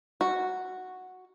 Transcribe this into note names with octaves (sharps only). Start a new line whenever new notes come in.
F#4